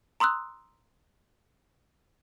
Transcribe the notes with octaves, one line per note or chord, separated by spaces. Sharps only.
A#5 C6 D#6 E6 F#6